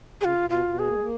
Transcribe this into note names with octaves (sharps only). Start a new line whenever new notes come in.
C#3 F4 G#4
C#3
B2
F4
B2
G#4
A#3
G#3
A#3